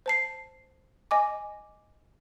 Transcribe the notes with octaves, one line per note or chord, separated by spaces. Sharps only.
C5 A5 C7
D#5 G#5 D6